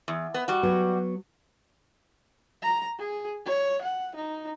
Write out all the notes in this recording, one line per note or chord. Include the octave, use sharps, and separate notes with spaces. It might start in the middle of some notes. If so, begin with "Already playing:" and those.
E2
B3
G3 F#4
F#3 B3
A#5
G#4
C#5
F#5
D#4